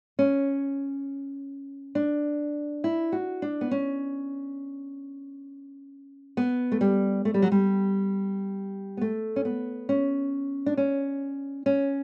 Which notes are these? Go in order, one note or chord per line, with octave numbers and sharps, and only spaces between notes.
C#4
D4
E4
F#4
D4
B3
C#4
B3
A3
G3
A3
G3
F#3
G3
B3
A3
C#4
B3
C#4
D4
C#4
C#4